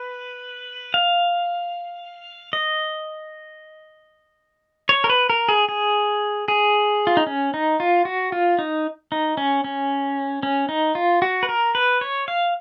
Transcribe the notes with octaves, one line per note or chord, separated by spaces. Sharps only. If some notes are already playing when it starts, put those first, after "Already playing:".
Already playing: B4
F5
D#5
C#5
A#4
B4
A#4
G#4
G#4
G#4
F4
D#4
C#4
D#4
F4
F#4
F4
D#4
D#4
C#4
C#4
C#4
D#4
F4
F#4
B4
A#4
B4
C#5
F5